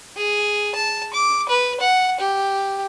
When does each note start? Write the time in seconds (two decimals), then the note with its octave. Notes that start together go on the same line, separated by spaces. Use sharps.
0.17 G#4
0.75 A5
1.14 D6
1.49 B4
1.81 F#5
2.20 G4